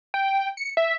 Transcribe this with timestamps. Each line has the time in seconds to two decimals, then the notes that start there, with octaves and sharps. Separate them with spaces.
0.14 G5
0.57 C#7
0.77 E5